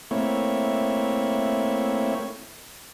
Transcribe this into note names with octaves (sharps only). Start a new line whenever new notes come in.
A3 A#3 C4 E4 C#5